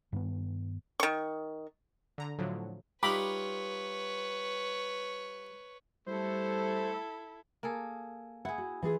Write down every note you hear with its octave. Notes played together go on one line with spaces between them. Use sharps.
G2 D#3 B3
D#3 C#6
D3 A#5
A2 D3 F3 F#3
G3 D#4 F4 B4 C#5 B5 D6
G3 A3 E4 A4 C5
A#3 G#4 A4
E4 G#4 F#5
F#4
E3 F4 G#4